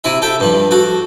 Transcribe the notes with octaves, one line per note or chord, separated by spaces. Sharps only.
C3 E4 E5
A4 E5 G5
G2 F3
F#4 A4